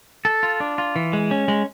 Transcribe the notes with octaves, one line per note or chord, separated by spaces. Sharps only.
A4
F4
D4
F4
E3
G#3
C#4
G#3